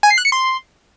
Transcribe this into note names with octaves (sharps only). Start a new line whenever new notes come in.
G#5
C7
F#6
C#7
C6